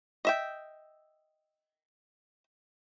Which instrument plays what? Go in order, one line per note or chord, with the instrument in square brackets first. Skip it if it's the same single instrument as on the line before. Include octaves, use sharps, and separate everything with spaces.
[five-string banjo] D#5 E5 G5